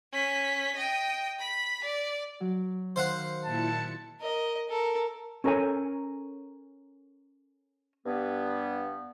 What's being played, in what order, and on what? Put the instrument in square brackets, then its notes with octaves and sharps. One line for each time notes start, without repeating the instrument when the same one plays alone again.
[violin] C#4 B6
D#5 G5
B5 B6
D5
[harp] F#3
[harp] D#3 [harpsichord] C5 F5 F#5
[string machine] A#2 E4 C#7 [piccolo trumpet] A5
[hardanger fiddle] A#4 D#5
A4 A#4
[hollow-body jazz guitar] C#4 A4 A#4 C#5 G#5
[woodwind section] G2 B3